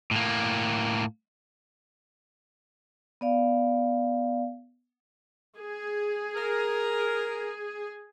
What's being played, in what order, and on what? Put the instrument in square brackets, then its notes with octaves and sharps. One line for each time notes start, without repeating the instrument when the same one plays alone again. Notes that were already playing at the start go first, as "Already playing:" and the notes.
[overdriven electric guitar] A2 A#3
[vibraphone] B3 D5 F5
[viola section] G#4
[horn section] A#4